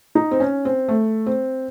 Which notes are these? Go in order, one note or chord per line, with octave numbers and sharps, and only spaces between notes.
D#4
C4
C#4
C4
A3
C4